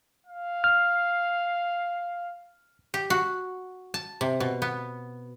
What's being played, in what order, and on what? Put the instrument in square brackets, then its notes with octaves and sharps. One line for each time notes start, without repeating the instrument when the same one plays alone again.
[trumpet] F5
[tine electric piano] F6
[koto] G4
F#4
A5
C3
B2
B3